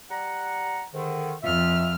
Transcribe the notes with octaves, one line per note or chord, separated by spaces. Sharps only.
G3 F#5 A#5
G#2 D3 D#3
F2 F4 E5 F6